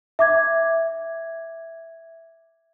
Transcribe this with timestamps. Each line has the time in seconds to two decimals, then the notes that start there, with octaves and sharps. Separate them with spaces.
0.19 E5 D6 G#6